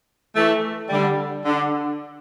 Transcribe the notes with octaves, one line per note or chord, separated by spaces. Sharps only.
E3 A3
D3 G3
D3